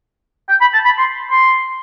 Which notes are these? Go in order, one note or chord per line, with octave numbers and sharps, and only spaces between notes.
G5
B5
A5
B5
C6
C6